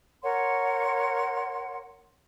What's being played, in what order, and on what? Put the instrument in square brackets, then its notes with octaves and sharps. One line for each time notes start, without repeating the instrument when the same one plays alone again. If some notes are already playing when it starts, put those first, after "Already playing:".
[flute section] A#4 C#5 F#5 C6